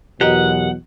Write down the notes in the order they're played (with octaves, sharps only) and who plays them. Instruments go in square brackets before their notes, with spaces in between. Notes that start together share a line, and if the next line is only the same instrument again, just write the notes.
[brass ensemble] E2 B2 F#3 [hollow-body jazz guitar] G4 A#4 D#5 [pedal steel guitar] F#5